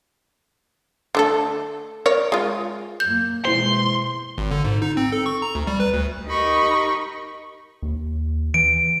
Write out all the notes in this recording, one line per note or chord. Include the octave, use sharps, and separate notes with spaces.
D3 A3 A4
A#4 C#5 D5
G#3 F4
F#2 A#3 G6
B2 E3 G#3 E4 C5 C6
G#1
D3
G#2
D#4
C4
A4
C#6
A#5
D2
G3
B4
D2
D#4 G4 A#4 D#5 B5 C#6
D#2
E3 D7